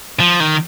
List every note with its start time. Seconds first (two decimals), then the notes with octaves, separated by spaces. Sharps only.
0.20 F3
0.40 D#3